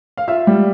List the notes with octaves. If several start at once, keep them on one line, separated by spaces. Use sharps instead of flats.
F5
F4 E5
G3